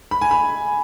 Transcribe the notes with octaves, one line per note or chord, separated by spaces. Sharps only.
B5
G#5
B5